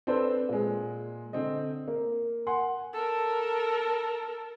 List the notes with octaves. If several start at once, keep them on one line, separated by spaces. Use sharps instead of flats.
C4 D4 A4 B4 C5
A#2 G#3
D3 C4 D#5
A#3
A#4 F#5 G#5 C6
A4 A#4